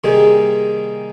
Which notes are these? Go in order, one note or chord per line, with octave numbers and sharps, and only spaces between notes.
C3 D#3 G3 A#3 G#4